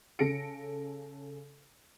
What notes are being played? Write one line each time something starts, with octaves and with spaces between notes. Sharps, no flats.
C#3 A4 A#6 C#7 D7